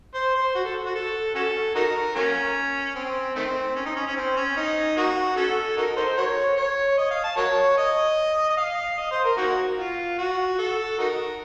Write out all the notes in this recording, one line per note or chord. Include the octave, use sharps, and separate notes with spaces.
C5
C5
F#4
A4
F#4
A4
C#4 F#4 A4
D#4 F#4 A#4
F#3 A#3 C#4
C4
D#3 A3 C4
C#4
D#4
C#4
C#4
C4
C#4
D#4
A#3 D#4 F#4
C#4 F#4 A4
D#4 F#4 A#4
D#4 A4 C5
F#4 A#4 C#5
C#5
D#5
F5
A5
F#4 A#4 C#5
D#5
D#5
F5
D#5
C5
A#4
A#3 D#4 F#4
F4
F#4
A4
D#4 F#4 A#4